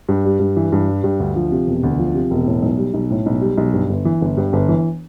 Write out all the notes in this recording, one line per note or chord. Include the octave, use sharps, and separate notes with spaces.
G2
G3
G2
E3
G2
G3
G2
D2
F3
C3
E1
D2
F3
C3
E1
A2
B1
G3
B1
A2
B1
G3
B1
G2
G1
E3
G1
G2
G1
E3